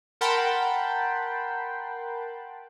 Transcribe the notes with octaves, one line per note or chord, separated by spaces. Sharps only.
A#4 F#5 G5 A5 B5 C6